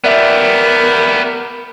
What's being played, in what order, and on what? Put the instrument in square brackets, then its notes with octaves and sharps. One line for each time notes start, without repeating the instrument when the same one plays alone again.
[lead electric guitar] B3 G4 [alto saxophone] A#4 [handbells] D5 E5